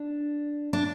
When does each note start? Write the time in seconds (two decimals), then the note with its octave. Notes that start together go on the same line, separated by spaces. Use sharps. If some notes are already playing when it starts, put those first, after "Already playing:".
Already playing: D4
0.73 D4